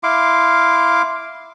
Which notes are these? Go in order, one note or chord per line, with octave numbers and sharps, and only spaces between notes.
E4 F5 C6 D6